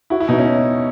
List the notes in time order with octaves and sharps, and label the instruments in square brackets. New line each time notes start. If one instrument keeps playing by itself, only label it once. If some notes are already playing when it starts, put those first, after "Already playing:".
[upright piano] E4 [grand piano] F#4
[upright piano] E4
[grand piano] B2 [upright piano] D#4
[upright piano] C#4